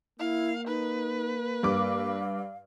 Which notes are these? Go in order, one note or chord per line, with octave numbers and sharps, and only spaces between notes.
A#3 E4 F5
D#4 B4
G2 F5 D6